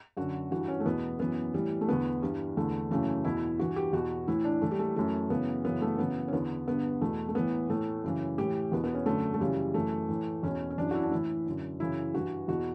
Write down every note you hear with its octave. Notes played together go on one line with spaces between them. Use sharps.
F#2 D3 F#4
G2 E3 F#4
C#4
A3
E2 B2 B3
F#2 E3 B3
A2 E3 G3
A3
E2 D3 B3
G2 E3 G3
E2 D3 A3
F#2 C#3 E3 A3
E2 B2 E4
G2 E3 F#4
G4
E2 B2 F#4
A2 E3 E4
D4
A2 E3 A3
G3
A3
F#2 E3 A3
F#2 C#3 E3 B3
F#2 C#3 E3 B3
A3
F#2 C#3 E3 B3
C#4
E2 D3 B3
G2 D3 B3
E2 B2 A3
A3
A2 E3 B3
A2 E3 A3
F#2 C#3 E3
A2 E3 G4
E2 B2 B3
B3
C#4
F#2 D3 A3
A3
F#2 C#3 E3 G3
F#2 E3 A3
A2 E3
E2 B2 C#4
C#4
F#2 E3 D4
F#4
E4
D4
A2 E3 E4
F#2 D3
F#2 C#3 E3 E4
G2 E3 F#4
E2 B2 F#4